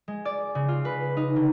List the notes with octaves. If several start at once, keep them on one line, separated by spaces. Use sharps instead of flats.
G#3
D5
C#3
F4
B4
D#4
D3